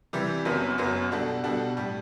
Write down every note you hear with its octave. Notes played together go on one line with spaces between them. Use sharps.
C3 E3 G3
F#1 F#2 F#3 B3
F#1 F#2 F#3 B3
B2 G3 D4 F#4 A4
B2 G3 D4 F#4 A4
A2 G3